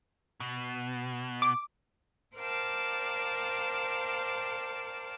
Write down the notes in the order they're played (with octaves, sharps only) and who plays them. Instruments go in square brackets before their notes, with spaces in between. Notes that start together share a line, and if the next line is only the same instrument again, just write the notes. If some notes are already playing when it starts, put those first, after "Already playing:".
[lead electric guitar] B2
[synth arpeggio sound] D6
[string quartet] A#4 C5 D5 F5 G5 A5